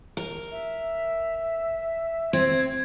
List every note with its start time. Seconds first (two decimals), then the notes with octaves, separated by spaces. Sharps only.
0.17 A#4
0.52 E5
2.33 C4 G#6